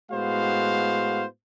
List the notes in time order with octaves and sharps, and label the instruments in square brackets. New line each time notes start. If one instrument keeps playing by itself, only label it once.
[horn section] A2 G#3 B3 F#4 C5 F5